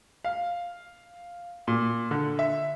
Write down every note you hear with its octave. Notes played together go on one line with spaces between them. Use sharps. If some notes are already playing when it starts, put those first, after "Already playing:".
F5
A#2
D3
E5